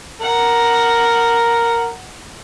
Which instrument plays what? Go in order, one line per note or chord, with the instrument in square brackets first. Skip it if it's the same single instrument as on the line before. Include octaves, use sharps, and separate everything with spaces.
[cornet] A#4 [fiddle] F#5